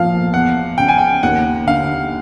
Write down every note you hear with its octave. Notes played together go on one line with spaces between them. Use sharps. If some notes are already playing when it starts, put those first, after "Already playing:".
Already playing: A#2 F3 F5
E2 F#5
C#3 G5
G#5
G5
D#2 F#5
D3 F5